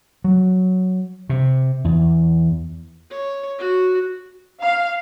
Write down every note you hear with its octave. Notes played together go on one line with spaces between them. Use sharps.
F#3
C3
E2
C#5
F#4
F5